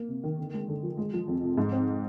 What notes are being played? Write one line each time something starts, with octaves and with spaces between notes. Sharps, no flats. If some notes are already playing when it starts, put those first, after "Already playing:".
Already playing: A#3
C3
D#3
D3
G#3
D3
F3
G#3
F3
F2
C3
G#2
C4